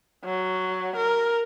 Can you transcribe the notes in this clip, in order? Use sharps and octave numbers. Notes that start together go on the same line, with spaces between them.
F#3
A#4